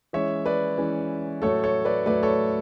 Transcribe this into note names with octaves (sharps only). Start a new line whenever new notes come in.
E3 G#3 C#4 C#5 E5
B4 D5
E3 G#3 C#4
A2 F#3 A3 A4 C#5
A4 C#5
B4 D5
A2 F#3 A3 B4 D5
A4 C#5